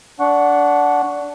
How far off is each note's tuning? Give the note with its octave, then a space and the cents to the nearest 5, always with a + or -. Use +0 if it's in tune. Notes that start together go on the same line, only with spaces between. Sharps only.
D4 -20 F#5 +0 C#6 +5